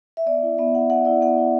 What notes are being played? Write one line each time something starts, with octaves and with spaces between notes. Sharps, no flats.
E5
B3 D5
E4
B3 E5
E4 F#5
B3 F#5
E4 D5
B3 F#5
E4